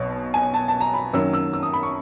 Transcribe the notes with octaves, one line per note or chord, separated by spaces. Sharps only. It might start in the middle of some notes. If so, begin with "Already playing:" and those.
Already playing: B1 B2 F#3
G#5
A5
A5
A#5
B5
F#2 D#3 F#3 A#3 E6
E6
E6
D#6
B5
C#6